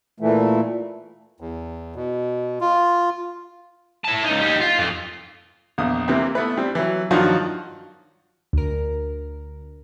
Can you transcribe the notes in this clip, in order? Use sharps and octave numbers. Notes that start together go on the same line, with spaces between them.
A#2 E3 A3
E2
B2
F4
E4 A5
C#2 D#4
D#4 G4
F4
F2
A#1 E2 D#6
C3 E3 A#3 C4
A3 B3 E4 B4
G3 C4
E3 F#3
G2 D#3 F3 F#3 F4 F#4
D2 A#4